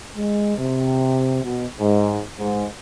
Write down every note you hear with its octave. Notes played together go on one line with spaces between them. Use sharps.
G#3
C3
B2
G#2
G#2